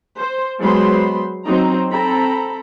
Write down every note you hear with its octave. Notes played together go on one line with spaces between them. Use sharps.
C5
F#3 G#3 B3 C5 B5 C6
F#3 C4 D#4 A#5
C4 A4 A#5 B5